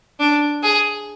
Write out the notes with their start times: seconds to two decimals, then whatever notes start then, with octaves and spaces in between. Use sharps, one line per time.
0.20 D4
0.63 G#4